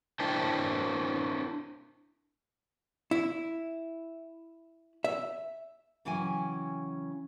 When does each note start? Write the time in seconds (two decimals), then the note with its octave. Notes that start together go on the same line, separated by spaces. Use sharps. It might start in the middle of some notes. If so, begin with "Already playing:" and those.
0.20 D4 E4 A#4 C5 G5 A5
3.11 E4
5.04 E5
6.05 C#3 E3 F#3 C#4 G5 G#5